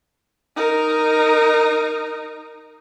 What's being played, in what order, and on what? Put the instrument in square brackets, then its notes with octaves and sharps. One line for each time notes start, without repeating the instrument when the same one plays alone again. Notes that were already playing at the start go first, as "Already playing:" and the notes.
[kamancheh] D#4 A#4